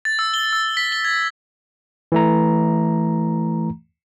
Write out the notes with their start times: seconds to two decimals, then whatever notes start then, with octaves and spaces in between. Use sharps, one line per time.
0.05 A6
0.19 E6
0.34 G7
0.53 E6
0.77 B6
0.92 G7
1.04 G#6
2.12 E3 A3 A#5